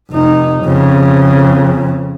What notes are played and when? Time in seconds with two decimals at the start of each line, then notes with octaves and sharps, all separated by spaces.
0.11 F1 D#4
0.64 F2 C#3